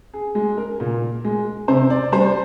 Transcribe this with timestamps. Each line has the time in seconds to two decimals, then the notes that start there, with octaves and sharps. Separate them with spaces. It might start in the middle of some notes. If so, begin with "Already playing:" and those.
0.14 G#4
0.35 G#3 G#4
0.57 A#4
0.80 A#2
1.24 G#3
1.68 C3 C5
1.90 D5
2.12 G3 C5